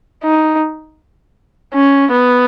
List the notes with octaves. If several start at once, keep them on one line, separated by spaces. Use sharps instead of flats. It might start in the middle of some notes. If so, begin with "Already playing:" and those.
D#4
C#4
B3